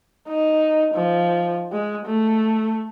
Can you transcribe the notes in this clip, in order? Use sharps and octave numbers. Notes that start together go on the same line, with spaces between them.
D#4
F3
G#3
A3